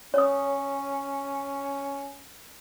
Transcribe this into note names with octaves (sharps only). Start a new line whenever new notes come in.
C#4 C#5 D#6